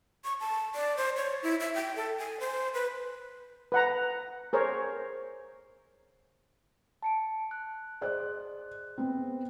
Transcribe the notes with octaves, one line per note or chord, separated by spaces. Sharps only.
C#6
A5
D5
C5
C#5
E4
E5
G5
A4
G#5
C5
B4
B4 F#5 A#5
G#4 A#4 C5 C#5
A5 C#7 D7
F#6
G#4 C5 D5 D#5 F#6
B3 C4